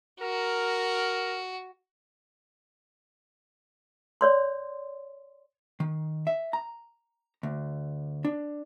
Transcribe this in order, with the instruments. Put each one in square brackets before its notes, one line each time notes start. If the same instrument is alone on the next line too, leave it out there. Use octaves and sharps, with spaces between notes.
[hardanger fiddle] F#4 [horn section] A#4
[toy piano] C#5 D5 C6
[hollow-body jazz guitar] D#3
E5
A#5
D2
D4